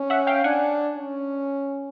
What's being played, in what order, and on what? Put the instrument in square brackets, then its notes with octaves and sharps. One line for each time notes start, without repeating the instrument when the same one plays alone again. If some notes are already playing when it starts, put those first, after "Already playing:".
Already playing: [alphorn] C#4
[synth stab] E5 F#5
F5 G5
[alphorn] D4 [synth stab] F#5 G#5
[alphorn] C#4